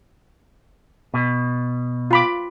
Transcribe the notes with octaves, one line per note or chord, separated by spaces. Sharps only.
B2
F4 B5 D6